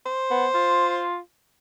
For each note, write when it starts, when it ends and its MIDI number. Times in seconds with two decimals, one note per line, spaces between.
0.06 1.04 72
0.31 0.47 59
0.54 1.18 65